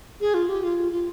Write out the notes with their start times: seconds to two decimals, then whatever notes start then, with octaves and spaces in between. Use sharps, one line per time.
0.21 G#4
0.34 F4
0.49 G4
0.63 F4
0.92 F4